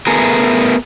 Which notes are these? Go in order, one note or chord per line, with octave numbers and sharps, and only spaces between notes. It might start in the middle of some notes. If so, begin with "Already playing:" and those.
A3 B3 G#4 A#4